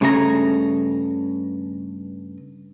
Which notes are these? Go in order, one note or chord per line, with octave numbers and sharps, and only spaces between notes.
G2 C#3 A3 G#4 A4 A#5